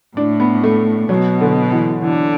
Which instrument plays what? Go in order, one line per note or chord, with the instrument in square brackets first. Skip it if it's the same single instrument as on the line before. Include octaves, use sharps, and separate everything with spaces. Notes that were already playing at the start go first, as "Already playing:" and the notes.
[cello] A2 [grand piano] D4
[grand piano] B3
A3
[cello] B2 [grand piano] F#3
[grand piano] D3
E3
[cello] D3 [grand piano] E3